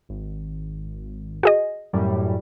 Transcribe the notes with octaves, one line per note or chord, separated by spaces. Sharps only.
G#1
F#4 G#4 D#5
F#2 A2 G3